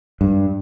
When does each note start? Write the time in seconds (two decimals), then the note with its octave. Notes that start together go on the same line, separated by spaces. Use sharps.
0.21 G2